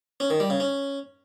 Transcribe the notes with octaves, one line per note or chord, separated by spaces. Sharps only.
C#4
D#3
G3
C#3
C#4